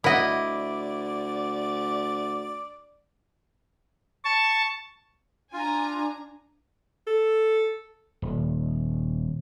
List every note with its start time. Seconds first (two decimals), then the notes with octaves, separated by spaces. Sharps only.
0.04 D2 E4 A#4 D5 D#5 F#5
4.25 A5 C#6
5.53 D4 F4 G#5 A#5
7.07 A4
8.22 D#1